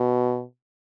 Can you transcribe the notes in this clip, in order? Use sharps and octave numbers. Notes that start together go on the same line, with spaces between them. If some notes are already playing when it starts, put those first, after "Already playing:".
Already playing: B2